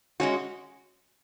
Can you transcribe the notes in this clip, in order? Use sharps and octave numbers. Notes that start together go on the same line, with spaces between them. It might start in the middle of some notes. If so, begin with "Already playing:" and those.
G#3 C#4 F#4